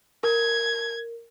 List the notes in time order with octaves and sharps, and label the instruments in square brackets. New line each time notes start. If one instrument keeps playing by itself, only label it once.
[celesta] A#4 [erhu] G#6